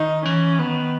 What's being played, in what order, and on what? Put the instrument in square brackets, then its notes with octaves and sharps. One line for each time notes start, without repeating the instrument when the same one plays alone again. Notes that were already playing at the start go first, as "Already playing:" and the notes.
Already playing: [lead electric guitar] D#3 [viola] D#4
[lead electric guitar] E3 [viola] C#4
[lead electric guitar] D#3 [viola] B3